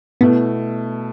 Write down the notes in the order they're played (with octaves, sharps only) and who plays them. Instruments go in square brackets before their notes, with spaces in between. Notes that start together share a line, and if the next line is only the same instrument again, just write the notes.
[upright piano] B2 A3 E4 [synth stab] B3